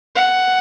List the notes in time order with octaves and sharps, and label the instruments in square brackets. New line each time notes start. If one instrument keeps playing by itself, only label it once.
[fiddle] F#5